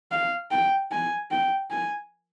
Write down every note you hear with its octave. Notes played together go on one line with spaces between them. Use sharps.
F5
G5
G#5
G5
G#5